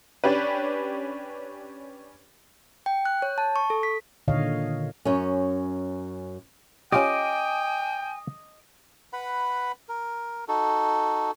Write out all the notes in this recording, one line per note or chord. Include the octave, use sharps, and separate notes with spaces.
C#4 D4 G4 B4
G5
F#6
C#5
A5
C#6
A4
B6
A#2 D3 D#3 C#5 D#5 F5
F#2 C#4
C#4 F4 G4 D#5 G5 G#5 D6
B4 F#5 B5
A#4
D#4 F#4 A4